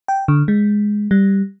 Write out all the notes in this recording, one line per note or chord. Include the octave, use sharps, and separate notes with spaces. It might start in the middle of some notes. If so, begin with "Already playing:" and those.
G5
D3
G#3
G3